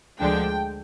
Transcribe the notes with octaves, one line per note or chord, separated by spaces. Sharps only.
D2 D3 F3 G#3 D4 G5